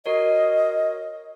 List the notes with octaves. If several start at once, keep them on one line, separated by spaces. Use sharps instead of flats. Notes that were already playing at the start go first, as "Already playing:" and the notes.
F#4 A#4 C#5 D#5